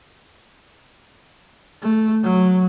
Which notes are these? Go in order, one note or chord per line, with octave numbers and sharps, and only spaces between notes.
A3
F#3